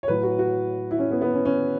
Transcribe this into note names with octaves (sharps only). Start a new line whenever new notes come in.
C#5
A2 F#3 B4
F#4
F#4
E4
C#4
B3
B3
C#4
C#4